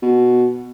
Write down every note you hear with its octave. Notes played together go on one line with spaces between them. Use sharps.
B2